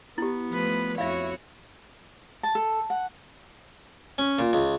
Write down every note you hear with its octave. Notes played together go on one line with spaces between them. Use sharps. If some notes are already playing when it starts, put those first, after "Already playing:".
B3 E4 G4
F3 A3 B4
F2 E4 F#4 C#5 E5 F5
A5
A4
F#5
C#4
A#2
C#2